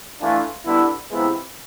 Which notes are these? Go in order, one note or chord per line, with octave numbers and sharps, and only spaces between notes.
E3 A3 D4 F4
D3 G3 B3 E4
C3 F3 G#3 B3 E4